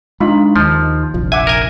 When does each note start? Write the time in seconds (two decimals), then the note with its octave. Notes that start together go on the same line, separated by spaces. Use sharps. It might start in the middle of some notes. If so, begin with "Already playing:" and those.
0.20 G#3 D4 D#4 F4 B5
0.56 D#2 D#3 F3
1.14 F1 A#1 F3
1.32 E5 F#5 G#5 D6
1.47 A#4 G#5